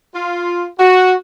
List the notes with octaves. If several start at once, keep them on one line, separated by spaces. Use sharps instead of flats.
F4
F#4